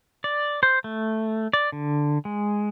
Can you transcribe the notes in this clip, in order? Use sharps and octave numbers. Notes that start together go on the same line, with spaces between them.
D5
C5
A3
D5
D3
G#3